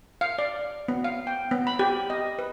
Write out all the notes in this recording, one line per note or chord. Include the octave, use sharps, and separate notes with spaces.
F5
D5
B3
F5
G5
B3
B5
G4
D#5
B4